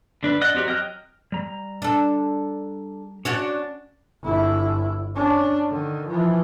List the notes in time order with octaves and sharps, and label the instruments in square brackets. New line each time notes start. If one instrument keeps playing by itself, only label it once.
[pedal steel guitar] D3 D4 B4
D5 D#5 F#5 F#6
C4 F#4 G4 A#4
F#3 D#5 G5 F6 F#6
[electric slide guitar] G3 A#5
[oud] D4 A4
[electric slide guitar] C#4 [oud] D4 F#4 C#5
[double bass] G1 E4
C#4 D4
D3 D#3
E3 F3